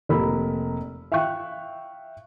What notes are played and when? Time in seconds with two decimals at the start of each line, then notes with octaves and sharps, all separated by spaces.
0.09 F1 A#3 A#4 B5 E6
1.12 E5 F5 G5 C#6 F#6